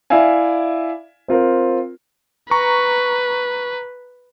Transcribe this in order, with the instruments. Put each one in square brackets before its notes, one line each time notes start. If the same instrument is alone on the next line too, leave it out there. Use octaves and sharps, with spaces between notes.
[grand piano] E4 D5 E5 F5 G#5
C4 F4 A#4 C5
[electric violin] B4 [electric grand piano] A#5 C#6